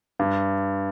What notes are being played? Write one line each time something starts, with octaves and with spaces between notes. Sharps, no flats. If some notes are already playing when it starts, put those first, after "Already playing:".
G2